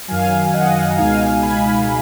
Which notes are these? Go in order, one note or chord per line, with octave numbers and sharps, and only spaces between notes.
F#2 D#3 F#3 F5 G#5
D#5 F#5
A#5
C#2 B2 G#3 D#4 F5 G#5
G#5 B5